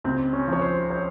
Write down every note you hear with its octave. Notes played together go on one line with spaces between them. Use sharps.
C#2 C4
C#4
F3 C#5
C5
C#5